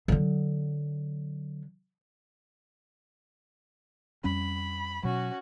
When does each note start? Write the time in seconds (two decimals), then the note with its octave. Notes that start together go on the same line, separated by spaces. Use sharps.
0.08 D3 F#3
4.24 F2 G3 C#4 B5
5.03 B2 F#3 C#4 F#4